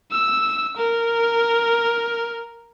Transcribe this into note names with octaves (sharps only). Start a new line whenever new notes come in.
E6
A#4